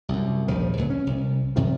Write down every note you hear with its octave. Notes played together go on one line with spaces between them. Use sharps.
C2 F#2
D#1 A#1 D#3 F3
C#2 A#2 F#3
C#4
C2
F#2 C3 D#3 F3